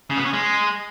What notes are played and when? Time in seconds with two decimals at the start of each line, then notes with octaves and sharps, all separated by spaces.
0.10 C#3
0.18 B3
0.25 C#4
0.33 G#3